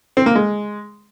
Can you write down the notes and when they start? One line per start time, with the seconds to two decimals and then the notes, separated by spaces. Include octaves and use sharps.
0.17 C4
0.26 A#3
0.35 G#3